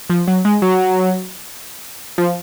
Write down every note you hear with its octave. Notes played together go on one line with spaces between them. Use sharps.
F3
F#3
G#3
F#3
F3